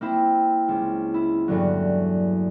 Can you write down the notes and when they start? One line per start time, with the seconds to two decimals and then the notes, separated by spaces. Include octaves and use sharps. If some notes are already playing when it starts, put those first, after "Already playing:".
0.01 A#3 C4 E4
0.68 C#2
1.14 E4
1.48 E2 G2 D3 F#3